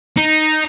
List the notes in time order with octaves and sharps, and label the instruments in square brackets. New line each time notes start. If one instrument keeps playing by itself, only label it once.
[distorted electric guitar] D#4